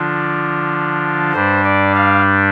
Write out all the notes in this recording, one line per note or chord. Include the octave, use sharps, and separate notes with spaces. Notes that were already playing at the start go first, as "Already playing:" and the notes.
Already playing: D3 F3 D4 F4
G2 G3 D4 C5
D5
F5